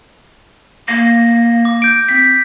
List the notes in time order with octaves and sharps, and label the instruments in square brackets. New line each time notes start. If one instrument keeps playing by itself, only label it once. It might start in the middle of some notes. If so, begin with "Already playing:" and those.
[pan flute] A#3 [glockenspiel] A#6
[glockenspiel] D6
G6 D7
[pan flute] C4 [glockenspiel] B6